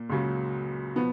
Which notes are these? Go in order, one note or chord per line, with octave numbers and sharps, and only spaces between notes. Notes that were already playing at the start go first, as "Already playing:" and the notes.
Already playing: A#2 A#3
C#2 C#3 F#3
B2 F3 B3